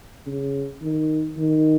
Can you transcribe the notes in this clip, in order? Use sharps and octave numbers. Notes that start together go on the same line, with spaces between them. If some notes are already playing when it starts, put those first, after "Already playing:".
C#3
D#3
D#3